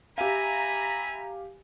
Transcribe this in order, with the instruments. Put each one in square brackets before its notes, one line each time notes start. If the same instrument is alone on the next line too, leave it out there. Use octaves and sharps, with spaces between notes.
[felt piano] G4 F5 [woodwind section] E5 A#5 [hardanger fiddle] G#5 [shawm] B5